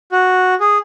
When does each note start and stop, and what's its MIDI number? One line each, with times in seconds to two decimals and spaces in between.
0.12 0.54 66
0.60 0.78 68